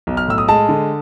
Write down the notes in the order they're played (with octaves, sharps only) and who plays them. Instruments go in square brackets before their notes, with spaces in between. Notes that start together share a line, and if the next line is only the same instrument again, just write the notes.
[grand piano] B1
F6
A2 E6
D#6
G#3 A5
D3